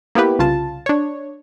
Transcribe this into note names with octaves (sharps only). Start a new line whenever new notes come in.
A#3 B3 E4 G4 B4
C2 C#3 F4 A5
D4 C#5